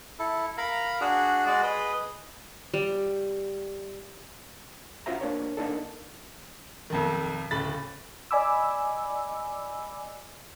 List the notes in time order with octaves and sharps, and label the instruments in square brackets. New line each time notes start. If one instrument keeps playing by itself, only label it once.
[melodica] E4 A4
A#4 F5 A#5 B5
D4 F#4 G#4
G#3 F#4 G#4 D5
G#4 B4 D#5
[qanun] G3
[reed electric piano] C#4 F4 F#4 C5 E5 A#5
A#3 D4 C5 C#5
A#3 D4 D#4 A4
[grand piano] B1 F2 D#3
D1 C#3 B5 A6
[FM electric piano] D5 D#5 G#5 B5 D6 E6